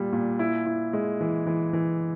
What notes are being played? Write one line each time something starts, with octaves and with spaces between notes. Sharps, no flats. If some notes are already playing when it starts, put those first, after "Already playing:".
Already playing: A#2 G3
A#2
E4
E4
G#3
E3
E3
E3